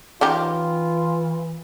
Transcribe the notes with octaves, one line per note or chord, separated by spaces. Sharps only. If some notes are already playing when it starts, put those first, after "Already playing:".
E3 C#4 D#4 F4 G4